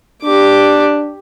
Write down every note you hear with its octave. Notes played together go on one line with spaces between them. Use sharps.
D4 G4 D6